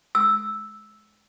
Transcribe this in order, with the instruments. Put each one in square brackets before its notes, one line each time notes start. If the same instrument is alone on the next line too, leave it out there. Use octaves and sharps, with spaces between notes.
[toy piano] E6